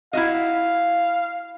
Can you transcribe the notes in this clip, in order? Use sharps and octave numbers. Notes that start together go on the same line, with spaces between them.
E4 F#4 D#5 F5